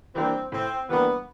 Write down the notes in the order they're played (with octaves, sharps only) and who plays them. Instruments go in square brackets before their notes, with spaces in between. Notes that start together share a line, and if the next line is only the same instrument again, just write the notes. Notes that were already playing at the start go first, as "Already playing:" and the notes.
[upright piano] E3 G3 A#3 D4 [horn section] C4
[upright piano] A2 [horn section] C4
[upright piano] E3 G3 A#3 D4 [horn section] B3